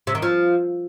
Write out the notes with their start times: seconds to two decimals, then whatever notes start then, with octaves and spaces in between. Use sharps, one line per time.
0.07 C3
0.15 D#3
0.22 F3